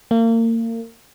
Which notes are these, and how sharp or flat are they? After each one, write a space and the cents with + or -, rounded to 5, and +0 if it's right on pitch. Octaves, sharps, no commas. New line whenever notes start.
A#3 -35